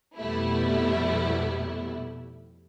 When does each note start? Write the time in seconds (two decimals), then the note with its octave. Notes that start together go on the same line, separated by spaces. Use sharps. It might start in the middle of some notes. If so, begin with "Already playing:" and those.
0.16 F2 B2 G3 A3 B3 E4